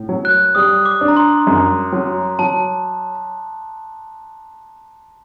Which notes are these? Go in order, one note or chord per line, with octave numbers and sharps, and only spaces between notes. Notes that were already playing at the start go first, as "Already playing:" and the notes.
Already playing: A2
F#3
F#6
G3 D#6
D6
D4
A#5
C6
F#2
F#3
F#3 A5